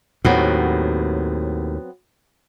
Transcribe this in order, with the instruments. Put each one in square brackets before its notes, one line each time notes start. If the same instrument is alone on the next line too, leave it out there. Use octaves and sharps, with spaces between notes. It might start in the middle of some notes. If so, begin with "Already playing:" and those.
[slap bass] D#2 A2 [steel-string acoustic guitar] F#3 B3 C4